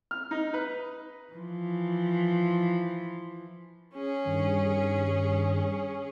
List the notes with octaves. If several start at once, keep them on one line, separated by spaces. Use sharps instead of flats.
F6
D#4
B4
E3 F3
C#4 G#4
G2 D#3 G3